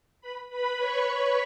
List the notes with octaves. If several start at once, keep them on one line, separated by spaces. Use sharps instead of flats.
B4 B5
B4 B5
C#5 C#6
B4 B5